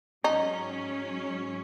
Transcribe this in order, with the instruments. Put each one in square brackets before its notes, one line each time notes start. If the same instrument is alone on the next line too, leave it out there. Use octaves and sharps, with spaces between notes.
[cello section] G#2 F#3 C#4 [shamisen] D#4